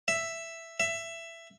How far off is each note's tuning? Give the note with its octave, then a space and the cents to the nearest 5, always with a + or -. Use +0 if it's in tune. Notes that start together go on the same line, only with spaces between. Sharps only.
E5 +5
E5 +15